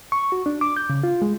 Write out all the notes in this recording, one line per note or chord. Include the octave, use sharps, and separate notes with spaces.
C#6
F#4
D4
D6
G6
C#3
F4
G#3